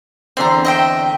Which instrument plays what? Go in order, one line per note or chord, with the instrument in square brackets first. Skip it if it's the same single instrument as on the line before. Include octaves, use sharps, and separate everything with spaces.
[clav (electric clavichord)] E2 D3 C4 [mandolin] A#5 C6
[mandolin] D#5 E5 G5